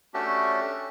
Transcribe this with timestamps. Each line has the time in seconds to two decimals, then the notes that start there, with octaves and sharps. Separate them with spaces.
0.14 A3 C#4 D4 F#4 G4 A4